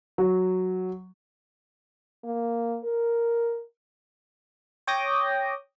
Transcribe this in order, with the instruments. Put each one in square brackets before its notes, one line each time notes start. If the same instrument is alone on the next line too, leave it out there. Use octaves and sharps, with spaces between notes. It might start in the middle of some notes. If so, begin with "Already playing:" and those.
[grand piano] F#3
[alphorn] A#3
A#4
[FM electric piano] C#5 G5 D6 D#6 G6 A#6